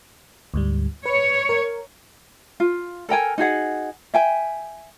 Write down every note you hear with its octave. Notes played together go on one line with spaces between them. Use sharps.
D2 G#2 G3
B4 C#5
A#4
F4
A4 A#4 G5 G#5
D#4 F#4 G#4 F#5
E5 G5 G#5